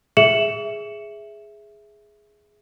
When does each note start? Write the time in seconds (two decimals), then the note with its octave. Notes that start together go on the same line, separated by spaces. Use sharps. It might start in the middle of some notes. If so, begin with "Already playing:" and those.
0.17 G#4 E5 C#7 E7 F#7